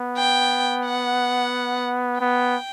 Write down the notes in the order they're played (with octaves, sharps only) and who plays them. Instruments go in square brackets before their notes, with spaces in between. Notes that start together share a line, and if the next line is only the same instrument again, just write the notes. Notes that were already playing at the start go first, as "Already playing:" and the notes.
Already playing: [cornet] B3
[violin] G5
F#5
[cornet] B3 [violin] G5